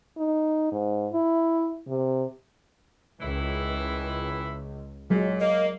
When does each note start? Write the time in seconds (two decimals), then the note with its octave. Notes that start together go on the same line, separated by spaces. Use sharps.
0.18 D#4
0.72 G#2
1.13 E4
1.87 C3
3.20 C#2 D#3 E3 E4
5.10 A#2 F#3 G#3
5.40 A#3 D#5